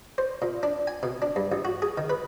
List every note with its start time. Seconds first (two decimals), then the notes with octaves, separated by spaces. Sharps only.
0.18 C5
0.42 A#2
0.63 D4
0.87 G#5
1.03 B2
1.22 D4
1.36 G2
1.52 A1
1.65 F#4
1.82 G#4
1.98 D#3
2.10 B4